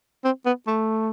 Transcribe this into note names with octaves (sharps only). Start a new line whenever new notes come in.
C4
B3
A3